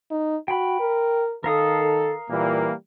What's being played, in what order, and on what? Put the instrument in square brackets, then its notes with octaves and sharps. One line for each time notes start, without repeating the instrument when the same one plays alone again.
[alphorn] D#4
[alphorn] F#4 [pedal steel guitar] G5 B5
[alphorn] A#4
[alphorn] D#3 [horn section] A4 [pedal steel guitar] A#4 F5 D#6
[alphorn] A#2 [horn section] E3 G3 A#3